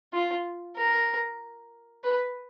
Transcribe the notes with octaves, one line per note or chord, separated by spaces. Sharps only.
F4
A#4
B4